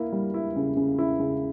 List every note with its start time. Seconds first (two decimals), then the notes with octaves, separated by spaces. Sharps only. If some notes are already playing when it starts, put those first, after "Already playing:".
Already playing: A#3 E4
0.12 G3
0.34 E4
0.56 C#3
0.77 C#3
0.98 E4
1.19 C#3